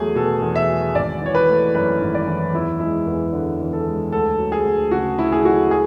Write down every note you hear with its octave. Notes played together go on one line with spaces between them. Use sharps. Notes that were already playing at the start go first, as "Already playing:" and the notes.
Already playing: E2 F#3 A3 G#4
B2 A4
E2
E5
F#3
G#1 D5
E3 C#5
B4
A3
F#2 B4
G#1
D5
E3
E2 E4
G#3 E4
E2
D3
E2
A4
G#3
D2 A4
F#3
G#4
D2
C#3 F#4
D2 E4
G#4
F#3 F#4
G#4